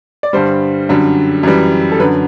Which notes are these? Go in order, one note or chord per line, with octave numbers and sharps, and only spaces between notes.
D5
G2 D3 G3 C5
F#2 D3 G3
F#2 E3 G3
A4
F#2 D3 F#3 B4